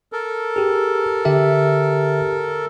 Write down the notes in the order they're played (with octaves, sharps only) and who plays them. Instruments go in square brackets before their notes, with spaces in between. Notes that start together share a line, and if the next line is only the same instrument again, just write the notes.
[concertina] A4 A#4
[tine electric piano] G4 G#4
D3 G4 E5